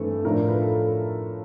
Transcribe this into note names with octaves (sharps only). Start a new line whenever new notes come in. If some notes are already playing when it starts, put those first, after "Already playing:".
Already playing: G2 E3 A3 C4 A4
A2 F3 A3 D4 F4 A#4
B4
A4